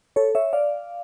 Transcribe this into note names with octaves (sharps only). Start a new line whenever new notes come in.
A4 C#5
C#5 E5
D5 F5